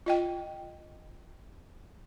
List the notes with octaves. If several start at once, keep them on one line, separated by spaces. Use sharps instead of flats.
F4 D#5 G5